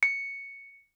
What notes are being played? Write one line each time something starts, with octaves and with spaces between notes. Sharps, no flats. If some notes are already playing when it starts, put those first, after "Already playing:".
C#7